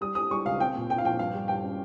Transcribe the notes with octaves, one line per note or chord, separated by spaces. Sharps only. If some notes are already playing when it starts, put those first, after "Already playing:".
G3 D#6
G3 D#6
G3 C#6
C#2 F5
C4 G5
A#2
A#2 G5
F5
A#1 G5
G2 F5
G3
G2 G5
C#4